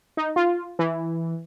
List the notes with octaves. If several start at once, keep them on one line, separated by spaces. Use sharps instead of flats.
D#4
F4
E3